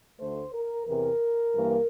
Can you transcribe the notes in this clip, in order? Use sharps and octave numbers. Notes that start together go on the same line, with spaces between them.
D2 D3 A3 C5
A#4
E2 C3 E3 A#4
G2 E3 A#3